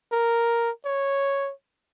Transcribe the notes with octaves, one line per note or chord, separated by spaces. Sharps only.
A#4
C#5